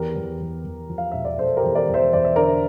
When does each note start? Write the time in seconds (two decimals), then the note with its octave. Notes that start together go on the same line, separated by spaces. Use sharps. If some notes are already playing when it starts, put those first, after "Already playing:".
Already playing: E2 G4 A#4
0.16 E2
0.40 E2
0.65 E2
0.89 F3
0.98 F5
1.12 E1 E5
1.25 D5
1.39 E1 A4 C5
1.57 G4 A#4
1.63 E2
1.75 A#4 D5
1.88 E2
1.94 C5 E5
2.13 E2 D5
2.25 E5
2.36 D3 A#4 D5